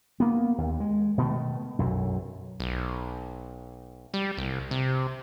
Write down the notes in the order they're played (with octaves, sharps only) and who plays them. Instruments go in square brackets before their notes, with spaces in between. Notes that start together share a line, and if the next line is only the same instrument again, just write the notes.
[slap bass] A#3 B3
D#2
G#3
B2 D#3 G#3 A3
B1 F#2
[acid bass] B1
G3
C2
C3